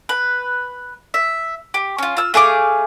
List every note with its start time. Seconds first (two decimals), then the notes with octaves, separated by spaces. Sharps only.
0.09 B4
1.14 E5
1.74 G4
1.98 C#4 F4
2.17 F4 E6
2.34 A3 G#4 F5 D6